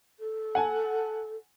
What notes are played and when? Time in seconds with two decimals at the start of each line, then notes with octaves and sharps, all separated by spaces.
0.19 A4
0.55 F#5 G#5 A5